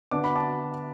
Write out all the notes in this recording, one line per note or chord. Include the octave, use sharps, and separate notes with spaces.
D3 B3 D4 D6
B5
A5 D6